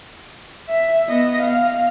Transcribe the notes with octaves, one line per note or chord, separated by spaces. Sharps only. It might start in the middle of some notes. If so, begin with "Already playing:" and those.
E5
B3 D#5
F5